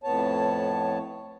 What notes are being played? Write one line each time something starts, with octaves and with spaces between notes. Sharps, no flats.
F2 A2 B3 C#5 A5